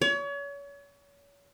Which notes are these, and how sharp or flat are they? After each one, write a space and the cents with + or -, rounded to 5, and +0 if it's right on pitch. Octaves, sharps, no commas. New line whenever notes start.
C#5 +35